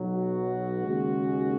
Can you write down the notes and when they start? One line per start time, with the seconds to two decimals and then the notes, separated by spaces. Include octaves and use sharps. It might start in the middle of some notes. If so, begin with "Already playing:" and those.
Already playing: B1 B2 F#3
0.16 F#4
0.85 D#2 C#3 G#3